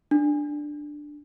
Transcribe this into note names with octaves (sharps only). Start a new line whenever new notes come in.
D4